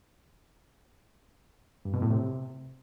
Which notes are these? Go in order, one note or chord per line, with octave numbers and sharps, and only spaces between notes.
G2
B2
A2
C3